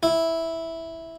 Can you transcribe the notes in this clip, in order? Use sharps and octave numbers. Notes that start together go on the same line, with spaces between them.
E4